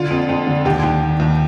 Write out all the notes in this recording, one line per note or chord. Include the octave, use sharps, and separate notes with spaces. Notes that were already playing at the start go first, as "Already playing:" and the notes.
Already playing: D3 F4
F2
F2
D3
D#2 G4
D#2
D#3
D#2